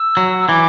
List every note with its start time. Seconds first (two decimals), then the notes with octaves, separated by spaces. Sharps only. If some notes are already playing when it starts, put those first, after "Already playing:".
Already playing: E6
0.17 F#3
0.40 E6
0.48 E3 D6